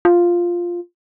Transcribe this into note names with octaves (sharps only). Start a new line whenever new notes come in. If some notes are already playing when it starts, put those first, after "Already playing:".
F4